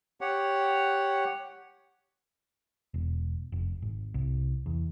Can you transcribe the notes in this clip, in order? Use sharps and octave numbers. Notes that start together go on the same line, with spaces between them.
G4 C#5 F#5
E1
F1
G#1
C2
E2